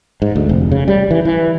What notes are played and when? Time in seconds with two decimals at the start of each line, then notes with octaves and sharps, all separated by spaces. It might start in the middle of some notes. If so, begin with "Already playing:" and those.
0.22 G#2
0.36 D2
0.49 F1
0.72 C#3
0.88 G3
1.11 E3
1.25 E3